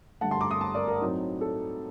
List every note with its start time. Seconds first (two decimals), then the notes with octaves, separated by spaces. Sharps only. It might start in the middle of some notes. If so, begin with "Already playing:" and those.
0.21 G2 D3 A3 F#5 A5
0.31 A5 C6
0.41 A#5 D6
0.51 C6 D#6
0.61 A5 C6
0.74 A#4 D5
0.87 A#4
1.01 A2 F#3 C4 D#4
1.41 A4